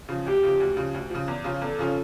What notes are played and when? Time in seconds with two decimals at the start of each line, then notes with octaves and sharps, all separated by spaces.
0.09 C#3 F3
0.26 D2 G4
0.43 C#3 F3
0.60 D2
0.77 C#3 F3
0.94 D2
1.10 C#3 F3
1.28 E2
1.44 C#3 F3 C#4 F4
1.61 E2 A4
1.79 C#3 F3 C#4 F4